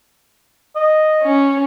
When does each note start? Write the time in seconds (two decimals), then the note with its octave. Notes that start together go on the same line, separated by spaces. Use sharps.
0.76 D#5
1.23 C#4